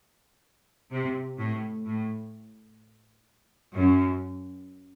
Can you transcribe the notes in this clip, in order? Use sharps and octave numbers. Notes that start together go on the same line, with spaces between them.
C3
A2
A2
F#2